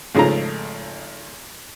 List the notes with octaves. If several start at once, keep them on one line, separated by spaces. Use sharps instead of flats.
G#1 C#3 F3 A3 D#4 A#5